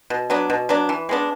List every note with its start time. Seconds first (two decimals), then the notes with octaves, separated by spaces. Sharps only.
0.10 B2
0.30 F#3 B3 D4
0.50 B2
0.69 F#3 B3 D4
0.89 E3
1.09 G#3 B3 D4